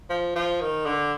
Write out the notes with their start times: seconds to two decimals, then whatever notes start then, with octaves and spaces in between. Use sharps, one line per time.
0.10 F3
0.35 F3
0.61 D#3
0.86 D3